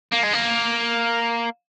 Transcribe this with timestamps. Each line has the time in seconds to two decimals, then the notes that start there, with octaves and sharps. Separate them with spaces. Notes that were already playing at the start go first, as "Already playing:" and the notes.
0.12 A#3
0.23 G#3
0.33 A#3